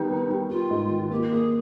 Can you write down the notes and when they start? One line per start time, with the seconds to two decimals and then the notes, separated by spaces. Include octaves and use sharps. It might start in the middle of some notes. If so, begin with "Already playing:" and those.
Already playing: D#3 G3 B3 D#4
0.10 B3
0.30 G3
0.50 G3 F4
0.71 G#2
0.91 D#3
1.11 A#3 G4
1.31 A#3 G#4